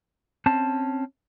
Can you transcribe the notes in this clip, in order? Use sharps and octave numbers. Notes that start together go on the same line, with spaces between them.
C4 C#4 A5